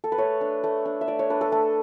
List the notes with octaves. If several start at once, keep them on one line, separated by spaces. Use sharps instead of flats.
A4
B4
A3 C#5
D4
A3
D4
E5
A3 D5
C#5
D4 B4
A4
A3 A4